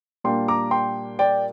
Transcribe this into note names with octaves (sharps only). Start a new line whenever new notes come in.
A#2 G3 A#3 D4 G5 C6
A#5 D6
G5 C6
D5 G5